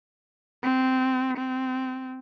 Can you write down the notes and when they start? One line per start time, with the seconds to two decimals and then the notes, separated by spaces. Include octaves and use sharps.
0.63 C4
1.38 C4